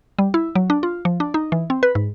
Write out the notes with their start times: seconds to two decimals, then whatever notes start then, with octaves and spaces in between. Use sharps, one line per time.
0.19 G3
0.34 E4
0.55 F#3
0.70 D4
0.83 F4
1.05 F3
1.20 D4
1.34 D#4
1.52 E3
1.70 C4
1.83 B4
1.95 G#2